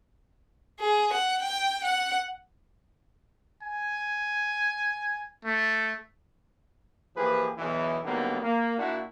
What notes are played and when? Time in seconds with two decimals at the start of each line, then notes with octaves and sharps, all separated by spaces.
0.80 G#4
1.13 F#5
1.42 G5
1.84 F#5
3.62 G#5
5.45 A3
7.16 E3 F3 A#3 G4 G#4 B4
7.58 B1 E2 E3
8.04 D3 D#3 F#3 G3 A#3 B3
8.41 A#3
8.78 A#2 D4 E4 F#4